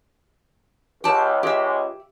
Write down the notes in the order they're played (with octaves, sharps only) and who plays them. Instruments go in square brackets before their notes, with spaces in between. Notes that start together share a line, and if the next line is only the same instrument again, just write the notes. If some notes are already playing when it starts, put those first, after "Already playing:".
[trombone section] C#2 [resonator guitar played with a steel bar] G4 A5
[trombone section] C#2 G#3 [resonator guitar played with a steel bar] G4 E5